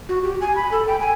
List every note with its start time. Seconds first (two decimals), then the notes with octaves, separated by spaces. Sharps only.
0.09 F#4
0.23 G4
0.41 G#5
0.56 B5
0.71 A4
0.88 G5
1.01 G#5